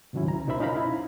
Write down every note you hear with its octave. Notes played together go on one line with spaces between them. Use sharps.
G#2 C3 D#3 F#3 C#4 E4
C#2 A#5
B2 D#4 A#4 C5 E5 B5
C#4 D#4 F4 F5 A#5 B5
E4